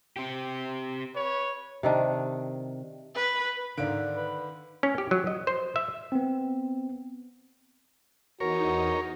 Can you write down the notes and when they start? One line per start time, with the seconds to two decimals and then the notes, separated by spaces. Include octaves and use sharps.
0.16 C4 G4
1.15 B4 C#5
1.83 C3 D#3 D4
3.15 B4
3.77 G#2 D3 D#3 D5 F5 F#6 D7
4.16 B4
4.83 C#4
4.98 G4
5.11 F#3
5.27 D#5
5.47 C5
5.76 E5
6.12 B3 C4
8.40 E2 D#4 F#4 A#4 C#5